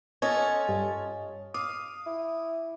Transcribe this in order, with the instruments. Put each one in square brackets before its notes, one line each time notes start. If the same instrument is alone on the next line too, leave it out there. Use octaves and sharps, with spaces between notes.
[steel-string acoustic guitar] C#4 F4 A4 [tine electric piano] C#5 D#5 [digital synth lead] G#6
[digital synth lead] G2
[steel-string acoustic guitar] F5 [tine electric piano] D6 [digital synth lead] D#6
[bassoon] E4